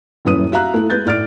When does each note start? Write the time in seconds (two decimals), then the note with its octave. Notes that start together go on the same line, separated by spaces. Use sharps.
0.25 D#1 F#2 E4 B4 D#6 D#7
0.52 F#4 E5 F5 A#5 F#6
0.74 A3 E4
0.90 G#3 B4 G6 A6
1.06 A2 D5 F6 A6 D7